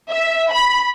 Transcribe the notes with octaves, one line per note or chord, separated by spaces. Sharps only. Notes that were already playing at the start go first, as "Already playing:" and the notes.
E5
B5